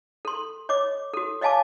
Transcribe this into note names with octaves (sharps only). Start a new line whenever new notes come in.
A4 C6
C#5 D#5 D6
F#4 A4
C#5 D#5 F5 G#5 A5 D6